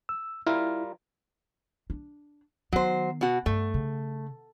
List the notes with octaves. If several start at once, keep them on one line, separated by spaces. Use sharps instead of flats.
E6
G3 E4 F4 A#4
D4
D#3 F#3 B3 C5
B2 F#4
G2 A3
C#3